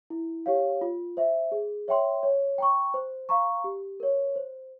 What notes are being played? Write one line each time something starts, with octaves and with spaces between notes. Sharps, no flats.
E4
G4 C#5 F5
F4
C5 E5
G#4
C#5 E5 G5 C6
C#5
G5 A#5 C#6
C5
F5 A#5 C#6
G4
A#4 C#5
C5